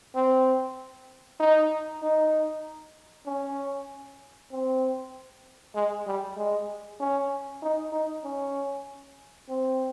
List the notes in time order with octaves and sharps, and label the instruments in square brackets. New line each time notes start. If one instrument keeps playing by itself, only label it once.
[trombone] C4
D#4
D#4
C#4
C4
G#3
G3
G#3
C#4
D#4
D#4
C#4
C4